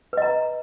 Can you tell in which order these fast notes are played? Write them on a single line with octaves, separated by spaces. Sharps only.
B4 D#5 A#5